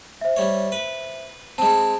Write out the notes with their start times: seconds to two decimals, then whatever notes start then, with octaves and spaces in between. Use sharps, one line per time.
0.21 C5 E5
0.37 G3 C#5
0.72 B4
1.58 G#3 C4 A5